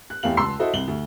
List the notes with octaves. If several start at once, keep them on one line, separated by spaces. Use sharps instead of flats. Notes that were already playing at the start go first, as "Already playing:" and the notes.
F#6
E2 A3 G4 F5 F#7
C#2 A5 C6 E6 C7
E4 F#4 A4 C5 D#5 E5
C2 F#7 G7
D2